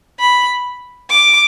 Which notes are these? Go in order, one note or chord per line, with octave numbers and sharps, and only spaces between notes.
B5
D6